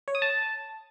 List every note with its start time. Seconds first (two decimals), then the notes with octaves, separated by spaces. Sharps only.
0.08 C#5
0.15 D#6
0.22 A5